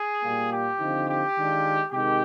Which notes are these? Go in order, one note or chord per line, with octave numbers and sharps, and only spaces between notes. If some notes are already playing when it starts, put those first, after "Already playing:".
Already playing: G#4
A#2 G3 A#3
G4
D3 F3 C4 D#4
G4
D#3 G#3 D4 F4
C3 D#3 G#3 D#4 G4